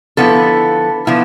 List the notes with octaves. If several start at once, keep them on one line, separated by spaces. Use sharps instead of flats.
D3 F3 B3 E4 A4
D3 F3 B3 E4